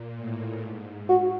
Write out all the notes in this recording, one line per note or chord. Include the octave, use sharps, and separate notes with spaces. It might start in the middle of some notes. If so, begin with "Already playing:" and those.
Already playing: A#2
A2
G#2
F#4